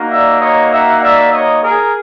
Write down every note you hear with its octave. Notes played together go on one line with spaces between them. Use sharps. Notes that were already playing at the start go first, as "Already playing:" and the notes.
Already playing: A#3 D#4 F#4
D5 E5
C#5 D#5
E5 F#5
D5 E5
C#5 D#5
G#4 A#4